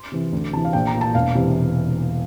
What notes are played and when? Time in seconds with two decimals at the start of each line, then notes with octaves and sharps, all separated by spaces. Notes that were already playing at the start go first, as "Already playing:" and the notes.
Already playing: C6
0.12 C3 E3
0.33 D2
0.52 C3 E3 A5
0.65 F5
0.73 A#1 G5
0.87 A#5
0.95 A#2
1.01 A5
1.15 E1 F5
1.35 C3 E3